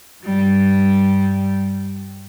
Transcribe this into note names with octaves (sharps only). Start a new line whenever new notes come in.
G2 G3